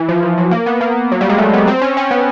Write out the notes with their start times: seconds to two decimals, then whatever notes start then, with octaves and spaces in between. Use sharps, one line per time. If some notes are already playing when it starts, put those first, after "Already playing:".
Already playing: E3
0.09 F3
0.23 E3
0.38 F#3
0.51 A#3
0.66 B3
0.81 A#3
1.12 F#3
1.21 G3
1.29 G#3
1.38 A3
1.53 B3
1.67 C4
1.81 C#4
1.97 C#4
2.11 B3